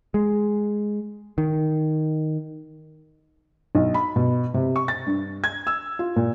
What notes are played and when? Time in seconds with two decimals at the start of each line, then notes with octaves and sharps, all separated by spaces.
0.14 G#3
1.38 D#3
3.75 B1
3.94 B5
4.16 B2
4.54 C3
4.76 C#6
4.88 A6
5.06 G2
5.44 G#6
5.67 E6
5.99 F4
6.16 A#2